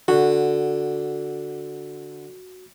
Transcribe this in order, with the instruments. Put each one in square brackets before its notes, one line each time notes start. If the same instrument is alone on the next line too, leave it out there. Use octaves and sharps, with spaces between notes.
[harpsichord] D3 [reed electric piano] F#4